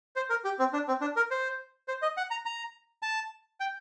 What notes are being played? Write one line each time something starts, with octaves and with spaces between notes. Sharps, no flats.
C5
A#4
G4
C4
D4
C4
D4
A#4
C5
C5
D#5
F#5
A#5
A#5
A5
G5